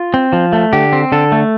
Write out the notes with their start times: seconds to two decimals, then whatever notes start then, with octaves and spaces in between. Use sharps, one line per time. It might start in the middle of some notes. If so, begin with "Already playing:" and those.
Already playing: F4
0.14 C4
0.33 F3
0.53 A3
0.73 D3 G4
0.93 C4
1.12 D3 A4
1.32 A3